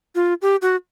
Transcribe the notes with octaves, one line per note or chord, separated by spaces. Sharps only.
F4
G4
F#4